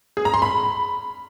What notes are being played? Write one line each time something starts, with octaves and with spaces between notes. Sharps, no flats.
G#4
A#5
C6
B5